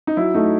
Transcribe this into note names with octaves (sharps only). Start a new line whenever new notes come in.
D#4
F#3 E4
A3 D#4